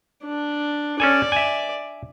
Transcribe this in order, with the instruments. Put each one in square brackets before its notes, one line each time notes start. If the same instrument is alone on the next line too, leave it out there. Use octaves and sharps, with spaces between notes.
[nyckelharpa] D4
[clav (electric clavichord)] C#4 A4 G#5 [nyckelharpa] D5
[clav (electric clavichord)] E5 G#5